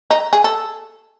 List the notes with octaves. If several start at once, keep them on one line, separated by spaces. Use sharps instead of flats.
D#4
G#4
A4